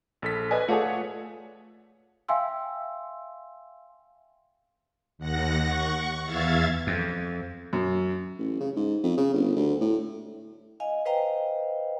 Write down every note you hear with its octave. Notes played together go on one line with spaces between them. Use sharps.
A#1 A4 B6
B4 D5 D#5 G#5
A3 F4 G#4 A4 C#5 D5 F#5
E5 F5 G5 G#5 C6 E6
D#2 F#5 A#6
F#5 C#6
C#6
E2 E5 F5 G#6 A6
F2
F#2
A1
C#3
G#2
F2
C#3
G1
D2
A2
D#5 F5 G#5
B4 C5 D#5 F5 G5 A#5